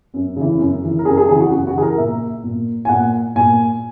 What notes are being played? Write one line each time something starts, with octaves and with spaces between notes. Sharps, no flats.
F#2
C#3 E3
F#2
C#3 E3
A#4
F#2 G#4
G#4
C#3 E3 G#4
F#4
F#2 F#4
F#4
C#3 E3 G#4
A#4
A#2 E5
A#2
G#5
A#2 F#5
A#2 G#5